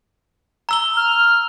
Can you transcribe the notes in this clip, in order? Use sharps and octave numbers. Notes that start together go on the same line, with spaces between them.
A#5 E6 G7
F6